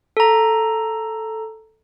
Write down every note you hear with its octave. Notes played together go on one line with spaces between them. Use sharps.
A4 A#5